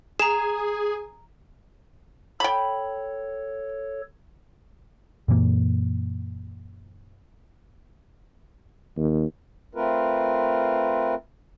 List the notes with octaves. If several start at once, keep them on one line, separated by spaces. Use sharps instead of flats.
G#4 A#5 E7
A4 C#5 G5 B5
F#2 A#2 E3 A#3
D#2
A3 C4 F4 A#4 B4